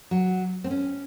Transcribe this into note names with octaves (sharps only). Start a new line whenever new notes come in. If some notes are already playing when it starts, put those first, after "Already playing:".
F#3
C4
C#4